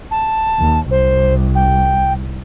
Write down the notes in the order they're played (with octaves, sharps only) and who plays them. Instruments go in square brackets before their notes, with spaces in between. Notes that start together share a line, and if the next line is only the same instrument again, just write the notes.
[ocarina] A5
[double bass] D#2
[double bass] C2 [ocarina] C5
[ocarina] G5